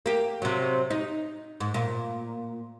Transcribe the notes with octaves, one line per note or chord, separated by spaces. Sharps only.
A#3 G4
C3 F#3
D#4
G#2
A#2